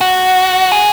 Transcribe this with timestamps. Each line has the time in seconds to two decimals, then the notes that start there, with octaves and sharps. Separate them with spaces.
0.01 F#4
0.72 G#4